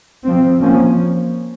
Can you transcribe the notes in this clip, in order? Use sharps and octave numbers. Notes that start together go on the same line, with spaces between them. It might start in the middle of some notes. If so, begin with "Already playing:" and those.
F3 C4
F3 A#3 C#4